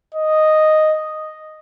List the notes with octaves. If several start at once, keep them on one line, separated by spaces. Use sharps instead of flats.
D#5